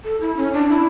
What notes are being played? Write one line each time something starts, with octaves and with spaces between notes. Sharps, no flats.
A4
E4
C#4
D4
E4